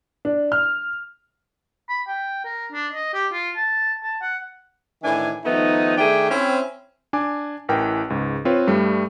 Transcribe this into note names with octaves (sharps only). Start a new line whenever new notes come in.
D4
F6
B5
G5
A#4
D4
D#5
G4
F4
A5
A5
F#5
A2 D#3 E3 D4 G#5
D#3 F3 A3 B3 D#4
D#3 A3 D4 G#4 E5 G5
C4 C#4 E4
D4 G#5 D6
A1 E3 A#4 G5
C#2 G#2
C4 F4 B4 C#5
G2 G3 A3